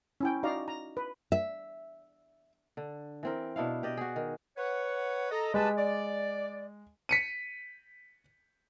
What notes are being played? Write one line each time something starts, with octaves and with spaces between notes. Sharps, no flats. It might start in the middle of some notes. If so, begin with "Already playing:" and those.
C#4 E4 G5
D#4 F#4 D5 F5 A#5
A#5
B4
E5
D3
E3 C4 A#4
B2 D4 E4 F5
G4 D5 D#5
F#4 G#4
D#3
B4 C#5 F#5
A4 D#5 A#5
G#3 G4 B4 A5
D5
B6 C#7 D#7